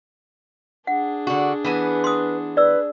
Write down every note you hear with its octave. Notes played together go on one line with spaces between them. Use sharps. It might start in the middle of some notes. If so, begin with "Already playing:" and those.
D4 G#4 F#5
D3 F#4
E3 B3 B4 G#5
C6 D#6
B4 D5 E6